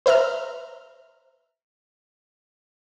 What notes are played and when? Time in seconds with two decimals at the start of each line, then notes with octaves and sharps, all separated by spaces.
0.06 B4 C5 E5 A#5 F6